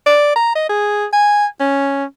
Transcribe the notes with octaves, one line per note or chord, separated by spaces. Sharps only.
D5
A#5
D#5
G#4
G#5
C#4